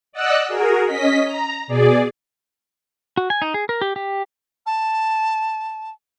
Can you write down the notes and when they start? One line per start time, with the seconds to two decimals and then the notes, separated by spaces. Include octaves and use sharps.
0.12 D5 D#5 F#5 E6 F#6
0.48 F#4 G#4 A#4
0.86 C#4 D#5 B6
1.24 A#5
1.68 B2 G#4 D5
3.17 F#4
3.30 G#5
3.42 D#4
3.54 G#4
3.69 A#4
3.81 G4
3.96 G4
4.66 A5